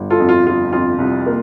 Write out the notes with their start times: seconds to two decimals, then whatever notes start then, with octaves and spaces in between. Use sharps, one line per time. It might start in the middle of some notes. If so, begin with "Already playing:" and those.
Already playing: G1
0.10 F4 A4
0.20 F2
0.29 F4
0.46 G1 F4
0.72 F2 F4
0.98 C2
1.26 A#3